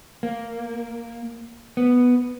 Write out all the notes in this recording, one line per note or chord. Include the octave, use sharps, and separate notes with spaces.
A#3
B3